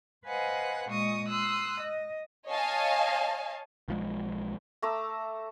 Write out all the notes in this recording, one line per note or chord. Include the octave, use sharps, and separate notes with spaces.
B4 C5 D#5 F5 F#5 G#5
A#2 G#3 D#5 C#6 D#6
C6 D#6 E6 F#6
D#5
C#5 D#5 F5 G#5 A5
B1 F3 G#3
A3 A#5 D6 E6